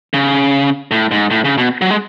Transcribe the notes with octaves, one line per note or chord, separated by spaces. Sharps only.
C#3
A2
G#2
A2
C#3
B2
F#3
G#3